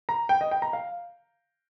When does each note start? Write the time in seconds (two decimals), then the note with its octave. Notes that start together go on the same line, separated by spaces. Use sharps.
0.09 A#5
0.29 G5
0.41 D#5
0.51 G5
0.62 A#5
0.73 F5